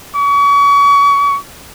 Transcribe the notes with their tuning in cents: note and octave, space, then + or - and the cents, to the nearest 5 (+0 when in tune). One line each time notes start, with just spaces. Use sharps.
C#6 +35